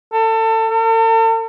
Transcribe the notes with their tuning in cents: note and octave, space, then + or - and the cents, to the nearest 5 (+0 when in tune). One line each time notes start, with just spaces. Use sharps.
A4 +30
A4 +45